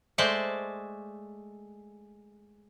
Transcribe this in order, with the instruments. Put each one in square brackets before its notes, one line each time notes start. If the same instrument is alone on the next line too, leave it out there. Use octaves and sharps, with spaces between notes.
[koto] G#3 A3 C5 D5 A5